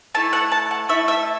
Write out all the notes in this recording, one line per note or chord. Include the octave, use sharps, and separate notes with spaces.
A3 E4 A4 A5
F#5
A5
F#5
A3 E4 A4 E5
E5